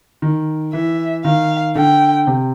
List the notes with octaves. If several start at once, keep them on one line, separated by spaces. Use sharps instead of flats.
D#3
E3 E5
D#3 F5
D3 G5
C3